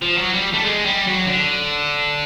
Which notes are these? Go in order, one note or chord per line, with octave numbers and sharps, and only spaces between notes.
F3
F#3
G3
A3
G#3
G3
F#3
D3